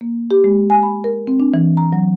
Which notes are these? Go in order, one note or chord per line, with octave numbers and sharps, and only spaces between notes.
A#3
G4
G#3
G#5
B5
A#4
C4
D4
E3
A#5
F#3